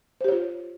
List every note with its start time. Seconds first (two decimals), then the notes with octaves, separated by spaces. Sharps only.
0.21 C5
0.24 G4
0.28 C#5
0.32 F4